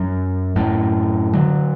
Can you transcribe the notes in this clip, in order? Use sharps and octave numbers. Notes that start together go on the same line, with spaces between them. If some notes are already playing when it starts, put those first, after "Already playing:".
Already playing: F#2
F#2 A2
D3 F#3